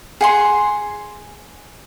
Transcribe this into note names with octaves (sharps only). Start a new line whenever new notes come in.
G#4 F#5 C6